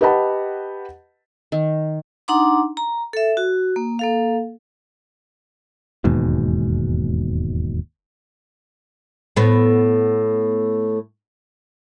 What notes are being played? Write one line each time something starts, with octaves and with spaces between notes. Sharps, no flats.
G4 B4 D#5 F#5 A5 B5
D#3
D4 D#4 F#5 A#5 C6 D6
A#5
A4 E5
F#4
A#3
A#3 A4 F5
E1 D#2 G#2 B2
A2 B3